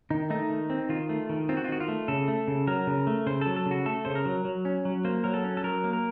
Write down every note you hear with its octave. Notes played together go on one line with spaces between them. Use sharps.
D#3 D#4
A3 D#4
D#3
C4
D#3 F4
A3
D#3
C4 F4
F#4
F4
D#3 F#4
F4
A3
C#3 A4
A3
C#3
F#3 A#4
C#3
A3
C#3 C5
F#3 A4
A4
C#3
F#4
A3 A4
C#3 C5
A#4
F#3
F#3
C#4
F#3
A#3 C5
F#3 A#4
A4
C#4
A4
F#3 A#4
A#3
A#4